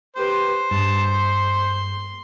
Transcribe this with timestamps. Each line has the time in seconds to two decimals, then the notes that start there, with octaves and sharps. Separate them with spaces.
0.16 G4 B4 C5
0.71 G2 A5
1.13 C6